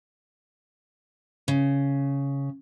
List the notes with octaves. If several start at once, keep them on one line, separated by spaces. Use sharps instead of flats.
C#3